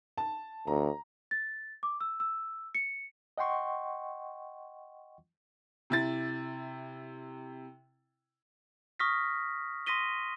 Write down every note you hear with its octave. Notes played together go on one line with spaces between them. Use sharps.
A5
D2 A#5
A6
D6
E6
E6
C#7
D#5 F#5 G5 C6 C#6
C3 E4 A6
C#6 D#6 F6 A#6 B6
C6 D#6 A#6 B6 D#7 G7